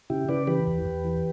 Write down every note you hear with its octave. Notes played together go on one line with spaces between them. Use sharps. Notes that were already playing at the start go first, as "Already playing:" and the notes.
C#3 E4 G4
C#3 B4 D5
E3 G4 B4
E2
E2
E3